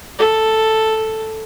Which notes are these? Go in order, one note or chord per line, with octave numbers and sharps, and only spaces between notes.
A4